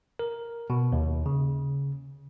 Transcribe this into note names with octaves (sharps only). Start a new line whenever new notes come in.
A#4
B2
D#2
C#3